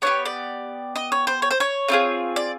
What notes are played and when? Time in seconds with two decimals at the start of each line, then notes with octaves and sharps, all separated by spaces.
0.02 B3 E4 G4 C#5
0.26 D5
0.96 D#5
1.12 C#5
1.27 C5
1.42 C#5
1.51 C5
1.60 C#5
1.88 A3 C4 F4 G#4
2.36 D5